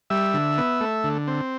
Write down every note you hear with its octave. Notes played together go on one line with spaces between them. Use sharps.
G3 E5
D3
B3
A3
D3
C4